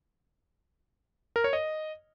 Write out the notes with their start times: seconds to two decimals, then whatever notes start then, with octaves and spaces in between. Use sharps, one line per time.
1.36 A#4
1.44 C#5
1.53 D#5